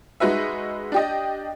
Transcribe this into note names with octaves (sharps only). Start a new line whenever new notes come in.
G#3 D#4 F#4 B4 E5
D4 G4 D#5